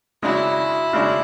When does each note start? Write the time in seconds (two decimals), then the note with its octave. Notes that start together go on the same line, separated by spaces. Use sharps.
0.23 C#3 G#3 D4 E4 F#4
0.93 C#3 G#3 D4 F#4